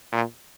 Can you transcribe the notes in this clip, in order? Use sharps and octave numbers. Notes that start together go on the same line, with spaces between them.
A#2